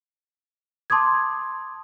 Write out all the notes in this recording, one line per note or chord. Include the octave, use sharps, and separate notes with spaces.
A5 C6 D6 D#6 G#6